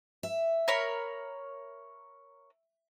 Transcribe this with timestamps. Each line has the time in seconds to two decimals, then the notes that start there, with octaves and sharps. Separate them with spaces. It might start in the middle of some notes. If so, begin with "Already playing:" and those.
0.23 E5
0.68 A#4 C#5 B5